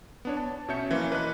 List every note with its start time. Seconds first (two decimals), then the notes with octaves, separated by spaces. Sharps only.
0.25 B3 D4 C#5
0.37 A5
0.68 B2 C#4 C#5 E5 G6 C#7
0.91 E3 F3 A#3 C#4 E4 F4
1.10 A#4 B4 D#5 F#6